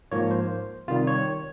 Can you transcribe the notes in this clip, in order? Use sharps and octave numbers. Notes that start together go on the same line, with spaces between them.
G#2 F3 A#3 C#5
C5
C3 D#3 G3 F4
C#5